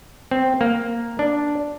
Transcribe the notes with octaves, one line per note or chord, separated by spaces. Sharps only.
C4
A#3
D4